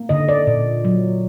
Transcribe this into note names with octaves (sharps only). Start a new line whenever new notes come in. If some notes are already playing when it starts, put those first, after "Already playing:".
Already playing: A#3
D3 D#5
D5
A#2
F#3